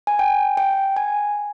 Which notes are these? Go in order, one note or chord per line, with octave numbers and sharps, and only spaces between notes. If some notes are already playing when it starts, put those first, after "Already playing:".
G#5
G5
G5
G#5